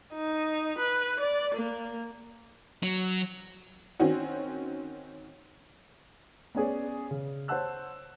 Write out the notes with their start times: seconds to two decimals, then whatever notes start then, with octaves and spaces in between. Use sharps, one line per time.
0.13 D#4
0.79 B4
1.20 D5
1.55 A#3
2.83 F#3
4.00 D#3 C4 C#4 F#4
6.55 B3 C#4 G#4 D5
7.11 C#3
7.48 C5 C#5 F#5 A5 E6 F#6